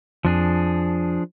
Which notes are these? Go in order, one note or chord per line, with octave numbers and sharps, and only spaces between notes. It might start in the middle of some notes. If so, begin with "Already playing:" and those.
F2 F3 D4 G#4